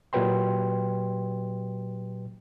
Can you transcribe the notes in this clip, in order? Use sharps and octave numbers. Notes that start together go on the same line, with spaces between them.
A#2 F#3 G4 B4 G5 C6